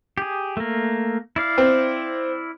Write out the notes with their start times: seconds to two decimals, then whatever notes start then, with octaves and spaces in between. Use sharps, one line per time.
0.18 G4 G#4
0.57 A3 A#3
1.36 E4 D5 F5
1.58 C4